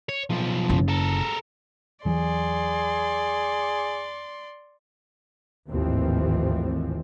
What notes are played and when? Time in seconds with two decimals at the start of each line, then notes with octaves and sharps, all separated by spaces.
0.09 C#5
0.30 B1 F3
0.69 F#1
0.89 A4 A#4
2.05 E2 E3 F#3 G#4 D5 C6
5.69 G#1 D#2 A2 E3 F3 C4